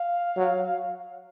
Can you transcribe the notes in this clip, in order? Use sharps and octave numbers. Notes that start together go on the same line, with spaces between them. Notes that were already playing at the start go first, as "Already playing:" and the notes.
Already playing: F5
F#3